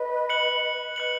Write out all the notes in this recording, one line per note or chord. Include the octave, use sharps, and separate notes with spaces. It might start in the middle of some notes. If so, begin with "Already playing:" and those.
Already playing: B4 D#5
F#6 C#7 F#7
B4 D#5 F#6 C#7 F#7